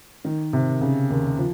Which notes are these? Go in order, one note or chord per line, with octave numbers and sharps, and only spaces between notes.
D#3
C3
C#3
D#2
F3